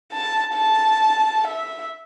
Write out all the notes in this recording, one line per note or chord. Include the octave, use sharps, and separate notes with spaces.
A5
A5
E5